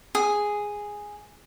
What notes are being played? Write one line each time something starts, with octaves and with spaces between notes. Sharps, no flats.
G#4